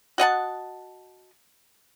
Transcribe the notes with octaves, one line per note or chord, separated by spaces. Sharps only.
F#4 D#5 F#5 A5